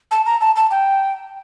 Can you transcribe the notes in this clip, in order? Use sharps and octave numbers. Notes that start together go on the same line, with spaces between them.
A5
A#5
A5
A5
G5